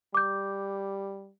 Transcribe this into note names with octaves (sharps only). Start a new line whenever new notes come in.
G3 D6 G6